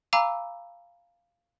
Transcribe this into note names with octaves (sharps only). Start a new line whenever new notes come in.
F5 G#5 A#5 B5 D6 E6